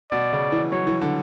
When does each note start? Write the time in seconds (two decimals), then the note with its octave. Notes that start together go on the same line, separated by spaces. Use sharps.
0.12 B2 D5
0.33 C#3
0.52 E3
0.72 F#3 C#5
0.87 E3
1.01 D3